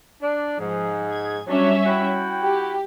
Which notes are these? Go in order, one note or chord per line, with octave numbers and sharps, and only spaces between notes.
D4
G#2 F3 G#4
G#6
F#3 G3 C#4 D4 E5
E4 F#4 G5
G4